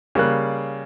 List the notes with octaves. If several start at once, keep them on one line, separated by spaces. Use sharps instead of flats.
C#3 G3 A#3 F#6